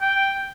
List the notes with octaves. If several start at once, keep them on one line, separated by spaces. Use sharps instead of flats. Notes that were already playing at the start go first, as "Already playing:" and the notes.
G5